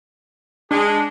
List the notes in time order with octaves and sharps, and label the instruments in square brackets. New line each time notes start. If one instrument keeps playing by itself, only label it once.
[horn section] G#3 G#4 [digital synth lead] D4